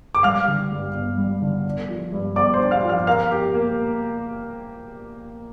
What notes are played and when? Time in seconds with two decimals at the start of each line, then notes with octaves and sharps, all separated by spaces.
0.15 D6
0.23 G3 F5 F6
0.47 D3
0.71 G2
0.94 G1
1.18 G3
1.42 D3
1.65 D4
1.88 F3
2.12 G2
2.36 G1 D5 D6
2.54 C5 C6
2.59 D4
2.71 F5 F6
2.83 F3
2.89 F5 F6
3.07 A#4 F5 F6
3.31 G4
3.54 A#3